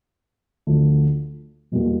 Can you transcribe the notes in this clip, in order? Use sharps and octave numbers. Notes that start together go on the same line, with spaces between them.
D2 D3 F3
E2 B2 G3 A#3